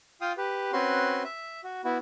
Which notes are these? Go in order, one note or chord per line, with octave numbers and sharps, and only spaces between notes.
F4 F5 G5 D#6
G4 B4
C4 C#4 F#4 B4 C6
E5
F#4
B3 E4 F#4